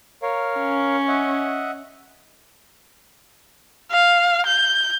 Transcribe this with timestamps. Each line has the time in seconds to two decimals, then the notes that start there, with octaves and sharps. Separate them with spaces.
0.22 A#4 C#5 F5
0.59 C#4
1.08 D#5 E5 F#5
3.92 F5
4.47 G6